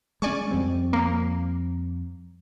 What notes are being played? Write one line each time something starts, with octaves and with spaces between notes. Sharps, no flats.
G#3 C#4 D5 G#5 C#6
F2 G3 C4
A#3